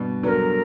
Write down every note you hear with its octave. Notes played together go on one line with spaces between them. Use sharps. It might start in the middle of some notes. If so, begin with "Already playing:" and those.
Already playing: G2 B2
D3 F#3 A#4 B4